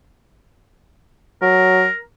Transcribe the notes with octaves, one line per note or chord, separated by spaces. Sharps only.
F#3 A#4